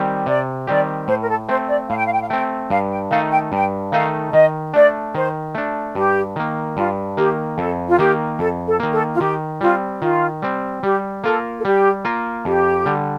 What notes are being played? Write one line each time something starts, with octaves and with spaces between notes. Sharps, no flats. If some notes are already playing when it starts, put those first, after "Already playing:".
Already playing: D#3 G3 C4 G4
C3 D5
D#3 G3 C4 G4 D5
A2 C5
A#4
A4
A3 C4 C5
D5
A2 F5
G5
F5
G5
F5
A3 C4 G5
G2 F5
G5
D#3 A3 D#4 A4 F5
G5
G2 G5
D#3 A3 D#4 A4 F5
D#3 D#5
A3 D4 D5
D#3 C5
A3 D4
G2 G4
D#3 A#3
G2 F4
D#3 A#3 G4
F2 A4
F4
D#3 A#3 G4
F2 A4
A4
D#3 A#3
A4
F4
D#3 G4
G3 C4 F4
D#3 F4
G3 C4
G3 G4
A#3 F4 A4 A#4
A4
G3 G4
A#3 F4 A#4
F2 G4
D3 G3